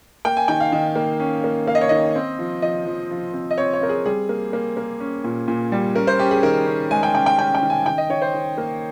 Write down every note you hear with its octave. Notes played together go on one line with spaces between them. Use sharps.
A#3 G5
G#5
D#3 G5
F5
D#3
A#3
C#4
A#3
A#3 F5
D#5
C#5
D#3 D#5
C4
F3
F3 D#5
F3
F3
C4
D#5
C4 C#5
C#5
C4 A#4
G#4
G3 G#4
A#3
A#3
A#3
C#4
A#2
A#2
G3
C#4 A#4
C5
C#4 G4
G#4
D#3 A#4
C#4
G#3 G#5
G5
C#4 G5
G5
C#4 G5
G5
D#3
G#5
D#3 G5
D#5
D#3 C#5
C5
D#3
A#3